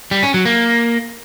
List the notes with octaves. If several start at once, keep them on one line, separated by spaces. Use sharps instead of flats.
G3
C#4
F#3
A#3